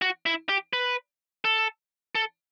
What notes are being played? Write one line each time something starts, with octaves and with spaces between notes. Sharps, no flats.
F#4
E4
G4
B4
A4
A4